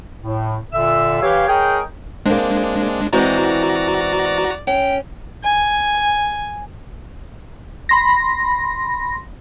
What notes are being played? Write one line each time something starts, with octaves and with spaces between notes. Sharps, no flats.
A2
A#2 D3 E5 E6
E3 G4 C#5 F5
G#4 A#4 C#5 D#5 G5
G#3 A#3 C4 D4
E3 G#3 C4 F#4 D5 A#5
C#4 G5
G#5
B5 C6 A#6